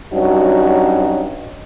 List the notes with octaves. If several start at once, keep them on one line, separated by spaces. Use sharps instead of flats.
G2 F#3 C#4 D#4 F#4